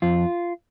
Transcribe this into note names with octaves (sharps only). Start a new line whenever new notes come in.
F2 F4